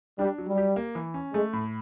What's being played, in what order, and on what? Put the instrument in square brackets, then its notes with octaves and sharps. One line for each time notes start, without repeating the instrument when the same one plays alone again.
[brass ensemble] G3 [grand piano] D4
[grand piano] F#3
[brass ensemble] G3
[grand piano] G4
A#3
E3
C#4
[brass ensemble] G#3 [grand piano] A3
[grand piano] A2